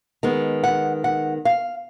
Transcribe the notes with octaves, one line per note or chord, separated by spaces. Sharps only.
D#3 G#3 B3
F#5
F#5
F5